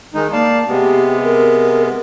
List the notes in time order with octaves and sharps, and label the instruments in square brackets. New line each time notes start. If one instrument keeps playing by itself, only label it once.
[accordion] D#3 G#3 D#4
[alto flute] A#3 [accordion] D5 F5 A5
[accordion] C3 G#3 B3 [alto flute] G4
[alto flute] A#4